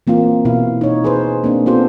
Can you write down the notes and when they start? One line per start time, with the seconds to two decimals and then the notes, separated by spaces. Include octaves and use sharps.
0.07 E3 A#3 C4 F4
0.45 B2 E4 F5
0.81 D#4 C#5
1.04 G#4 B4 C5
1.44 A#3 C4 D4
1.66 B3 C4 F4 G4 A4 C5